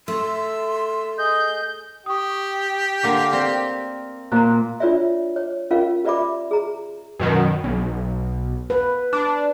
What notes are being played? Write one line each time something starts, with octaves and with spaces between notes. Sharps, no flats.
A3 E5 C6 E6
G#4 D#5 G6
G4 C#6 D#6
D3 A#3 F4 D6
C4 D5
A#2 A#5 F#6
D4 F4 B4 C#5 D5 E5
C#5
C#4 F4 A#4 F5
G4 B4 D5 E5 B5 D6
G#4 A#5
F#2 B2 D#3
B1
B4
D4